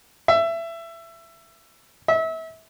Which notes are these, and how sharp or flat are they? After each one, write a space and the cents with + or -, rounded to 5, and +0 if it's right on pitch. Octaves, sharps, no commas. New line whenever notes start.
E5 +20
E5 -30